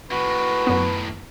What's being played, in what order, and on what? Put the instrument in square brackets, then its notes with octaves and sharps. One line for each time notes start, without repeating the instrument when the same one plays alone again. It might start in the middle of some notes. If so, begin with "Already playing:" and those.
[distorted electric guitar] A2 D#3 [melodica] F#4 [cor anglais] B4
[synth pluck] F#2 B3